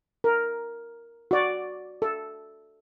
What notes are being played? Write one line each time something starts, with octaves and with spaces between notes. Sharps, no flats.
A#4
F#4 D5
A4